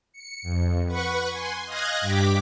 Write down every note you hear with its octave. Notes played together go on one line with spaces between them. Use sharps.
C#7
F2
B4 F#5 B5 C#6
G#5 C6
D#5 F5 F#6 G#6 A#6
G2 G4 D6 B6